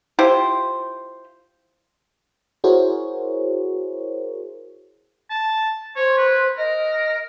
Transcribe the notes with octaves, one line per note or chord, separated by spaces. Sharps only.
E4 F4 G4 C5
E4 F#4 G#4 A#4 C5 C#5
A5
C5 C#5
B4
A#4 D#5